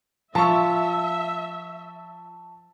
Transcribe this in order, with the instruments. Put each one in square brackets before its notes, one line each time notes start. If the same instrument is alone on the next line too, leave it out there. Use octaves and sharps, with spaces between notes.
[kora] F3 F4 [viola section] E5 [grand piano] A5 C#6